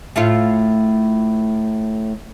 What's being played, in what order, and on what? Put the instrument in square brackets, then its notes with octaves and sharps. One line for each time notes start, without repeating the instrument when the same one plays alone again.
[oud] A2 A3 F4